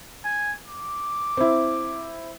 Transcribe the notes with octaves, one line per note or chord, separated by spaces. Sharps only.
G#5
D6
C4 E4